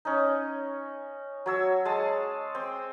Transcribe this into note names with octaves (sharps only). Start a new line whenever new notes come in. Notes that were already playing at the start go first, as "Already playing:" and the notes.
C#4 D#4
F#3 C#5 E6
G#3 A5
C4